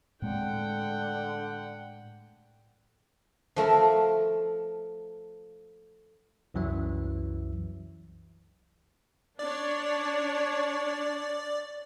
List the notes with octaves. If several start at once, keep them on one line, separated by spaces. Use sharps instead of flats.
A2 D3 G#3 C4 F#5 G5
F3 A3 A#4 E5
C2 F#2 E3 F#3 E5
D4 C#5 D5